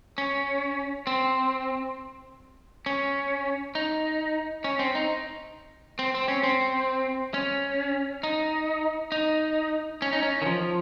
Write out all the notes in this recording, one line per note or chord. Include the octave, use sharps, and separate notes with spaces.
C#4
C4
C#4
D#4
C#4
C4
D#4
C4
C4
C#4
C4
C#4
D#4
D#4
C#4
D#4
C#4
D#3
F3